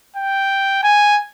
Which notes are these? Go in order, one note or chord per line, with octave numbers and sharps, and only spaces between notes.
G5
G#5